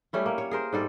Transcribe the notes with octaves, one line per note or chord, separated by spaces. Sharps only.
G3 A3 C#4 E4
A#3
C#5
G#4 A#4 C5
G#2 G3 A4